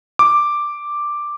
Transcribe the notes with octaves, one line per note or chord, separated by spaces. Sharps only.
D6